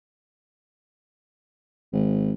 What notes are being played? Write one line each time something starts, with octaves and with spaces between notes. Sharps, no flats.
G#1